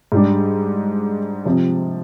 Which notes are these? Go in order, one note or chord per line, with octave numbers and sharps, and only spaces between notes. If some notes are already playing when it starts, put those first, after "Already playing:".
G#2 G3 D4
C3 F3 C4